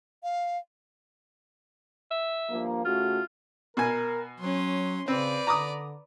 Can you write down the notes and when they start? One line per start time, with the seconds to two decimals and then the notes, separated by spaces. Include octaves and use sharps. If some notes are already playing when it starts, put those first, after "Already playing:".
0.23 F5
2.11 E5
2.50 G2 F3 A#3
2.85 C#3 A3 F4 F#4
3.77 B2 A#4 G#5
4.40 F#3 C#4 C6
5.08 C#3 C4 B4 D5
5.47 D3 A#5 D6 D#6